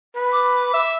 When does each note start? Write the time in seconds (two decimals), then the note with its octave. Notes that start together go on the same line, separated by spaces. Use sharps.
0.16 B4
0.32 D6
0.74 E5